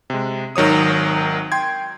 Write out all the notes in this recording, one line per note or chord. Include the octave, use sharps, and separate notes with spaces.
C3 G#3
G#1 D#3 F#3 C#5 D#6
G5 C6 G#6